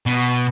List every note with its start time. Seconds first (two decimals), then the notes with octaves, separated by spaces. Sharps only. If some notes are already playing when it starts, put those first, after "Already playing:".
0.06 B2